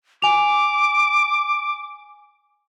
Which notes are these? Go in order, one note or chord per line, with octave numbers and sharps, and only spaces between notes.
G#5 D6 F7